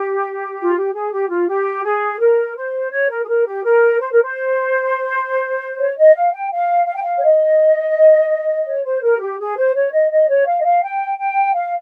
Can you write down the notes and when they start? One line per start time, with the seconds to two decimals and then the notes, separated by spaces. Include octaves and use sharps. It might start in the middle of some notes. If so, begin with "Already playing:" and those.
Already playing: G4
0.61 F4
0.75 G4
0.93 G#4
1.12 G4
1.29 F4
1.47 G4
1.84 G#4
2.20 A#4
2.56 C5
2.91 C#5
3.09 A#4
3.23 G#4
3.27 A#4
3.45 G4
3.64 A#4
3.99 C5
4.11 A#4
4.22 C5
5.78 C#5
5.97 D#5
6.15 F5
6.33 G5
6.51 F5
6.86 F5
6.95 G5
7.04 F5
7.17 C#5
7.23 D#5
8.66 C#5
8.84 C5
9.02 A#4
9.20 G4
9.39 G#4
9.57 C5
9.75 C#5
9.92 D#5
10.11 D#5
10.28 C#5
10.46 F5
10.60 D#5
10.64 F5
10.82 G5
11.18 G5
11.54 F5